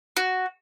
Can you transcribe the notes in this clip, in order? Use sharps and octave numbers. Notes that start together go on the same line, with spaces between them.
F#4